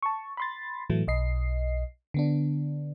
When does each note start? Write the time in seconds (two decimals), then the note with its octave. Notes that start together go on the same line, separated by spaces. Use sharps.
0.03 A5 C#6
0.37 B5 C6 A6
0.90 A2 E3 F#3 A3
1.08 B1 D#5 C7
2.14 D3 B3 D4